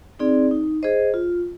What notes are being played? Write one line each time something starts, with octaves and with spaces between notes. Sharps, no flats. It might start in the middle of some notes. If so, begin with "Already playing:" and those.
C4 D#4 G#4 D5
D#4
G#4 C5 D#5
F4